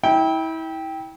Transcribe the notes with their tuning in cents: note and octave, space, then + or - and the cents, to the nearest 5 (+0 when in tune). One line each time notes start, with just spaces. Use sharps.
E4 -30 G5 +0